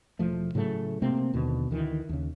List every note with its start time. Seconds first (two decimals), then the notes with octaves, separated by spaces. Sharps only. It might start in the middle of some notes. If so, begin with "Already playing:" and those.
0.19 E1 F3 A3
0.55 A2 C#3 F#3 A3
1.02 C3 A3 A#3 C4
1.33 D#2 B2 D3
1.71 D2 D#3 E3
2.09 D#2 C#3